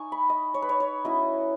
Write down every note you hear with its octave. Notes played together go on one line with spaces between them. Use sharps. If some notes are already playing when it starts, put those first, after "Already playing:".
Already playing: D#4 G#5 C#6
B5
D#5
C#5
B4
C#5
C#5
F#3 C#4 E4 D#5